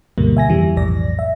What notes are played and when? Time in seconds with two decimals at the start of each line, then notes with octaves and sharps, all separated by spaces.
0.18 D2 G2 B2 D3 G3 A#3
0.37 E5 G#5 A#6
0.49 F2 E3 G3
0.77 B1 F2 A2 D5 A#6
1.19 E5